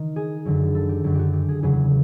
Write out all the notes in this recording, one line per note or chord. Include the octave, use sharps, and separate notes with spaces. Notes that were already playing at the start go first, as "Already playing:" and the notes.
Already playing: D#3
G#4
F#2 D3 F#3
A4
G4
F#2 D3 F#3 G4
F#4 G4
G4
G#4
E2 C#3 F#3 G#4